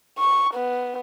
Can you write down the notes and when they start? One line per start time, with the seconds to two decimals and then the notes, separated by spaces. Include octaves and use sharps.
0.19 C#6
0.54 B3